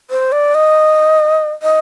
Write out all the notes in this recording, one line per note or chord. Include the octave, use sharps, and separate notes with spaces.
C5
D5
D#5
D#5